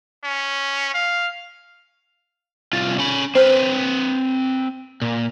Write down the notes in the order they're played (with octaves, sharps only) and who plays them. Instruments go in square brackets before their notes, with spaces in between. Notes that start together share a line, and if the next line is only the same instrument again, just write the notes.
[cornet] C#4
F5
[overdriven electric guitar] C2 F4 [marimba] A6
[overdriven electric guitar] C#4 B5
[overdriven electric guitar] C4 B4 [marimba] C5 F6
[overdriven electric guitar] A#2